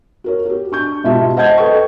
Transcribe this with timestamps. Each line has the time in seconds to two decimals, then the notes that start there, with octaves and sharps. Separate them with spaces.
0.24 F#4 A#4 C#5
0.45 F#4 G4
0.72 D4 C#6 G6
1.04 G#2 B2 F4 G4 E5 A5
1.36 C5 D#5 F#5 A5 G6 G#6
1.58 A4 B4 D#5 G5 C#6